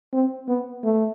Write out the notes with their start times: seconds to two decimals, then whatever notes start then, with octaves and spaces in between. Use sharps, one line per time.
0.13 C4
0.48 B3
0.84 A3